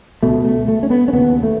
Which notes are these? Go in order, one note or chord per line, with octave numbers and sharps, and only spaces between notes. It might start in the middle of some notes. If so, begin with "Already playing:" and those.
C#2 B2 A3
A3
A3
C#4
B3
C#4
D#2 C#3 B3
A3